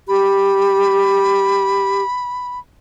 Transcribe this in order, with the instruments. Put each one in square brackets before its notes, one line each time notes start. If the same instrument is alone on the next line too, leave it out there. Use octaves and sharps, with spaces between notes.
[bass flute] G4 [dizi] B5